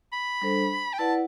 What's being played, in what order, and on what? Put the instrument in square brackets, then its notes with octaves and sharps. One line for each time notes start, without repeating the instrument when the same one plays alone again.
[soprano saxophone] B5
[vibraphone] G3 D4 A4 C5
[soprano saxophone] G5
[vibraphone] E4 B4 D5 F#5 [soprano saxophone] A5